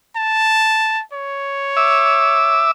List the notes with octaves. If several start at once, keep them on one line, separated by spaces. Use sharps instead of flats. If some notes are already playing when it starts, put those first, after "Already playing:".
A5
C#5
E5 D6 E6